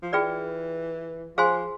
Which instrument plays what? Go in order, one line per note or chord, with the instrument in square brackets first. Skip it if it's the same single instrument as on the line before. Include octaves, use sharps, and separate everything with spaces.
[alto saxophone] F3
[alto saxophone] E3 [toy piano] F4 G#4 B4 D5 G5
[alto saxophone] F3 [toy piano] G#4 C5 F5 G#5 C6